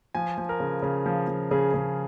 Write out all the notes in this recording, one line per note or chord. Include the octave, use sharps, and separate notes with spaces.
F3 G#5
F3
A#4
C#3
C#3
F3
F3
C#3 G#4
C#3